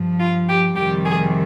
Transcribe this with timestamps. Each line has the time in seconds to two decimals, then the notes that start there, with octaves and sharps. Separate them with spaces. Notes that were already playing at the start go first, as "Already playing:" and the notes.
Already playing: G2 F3
0.19 F4
0.49 G4
0.76 F2 C3 D#3 G3 G4
1.05 G#4